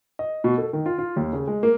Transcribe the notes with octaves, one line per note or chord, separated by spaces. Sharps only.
D#5
B2
A4
D#3
F4
F4
D#2
C#3
G#3
A#3